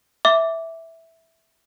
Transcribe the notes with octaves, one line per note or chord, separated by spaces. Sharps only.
E5 D6